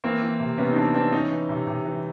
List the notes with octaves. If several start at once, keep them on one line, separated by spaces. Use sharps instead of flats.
E3 A#3 C4
E3
C3
C3 B3 C#4
D#4
E3 C4 D4
E3 C4 D4
E3 C#4 D#4
E3
C3
C3
E3